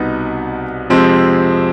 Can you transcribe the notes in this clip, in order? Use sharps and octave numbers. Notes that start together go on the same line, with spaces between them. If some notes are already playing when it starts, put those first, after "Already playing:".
Already playing: C2 B2 B3 D#4
F2 C3 F3 G#3 C4